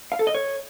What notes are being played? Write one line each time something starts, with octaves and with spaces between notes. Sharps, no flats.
F5
A4
D#5
C#5